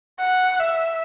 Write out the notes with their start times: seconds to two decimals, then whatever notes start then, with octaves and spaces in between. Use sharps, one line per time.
0.20 F#5
0.59 E5